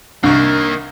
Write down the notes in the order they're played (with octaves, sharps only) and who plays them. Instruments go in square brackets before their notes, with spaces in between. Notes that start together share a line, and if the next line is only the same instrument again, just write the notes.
[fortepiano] C2 [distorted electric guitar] D#3 A#3 [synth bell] D4 C#6